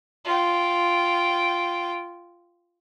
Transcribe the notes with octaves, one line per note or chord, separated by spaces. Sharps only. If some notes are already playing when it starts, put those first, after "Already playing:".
F4 G5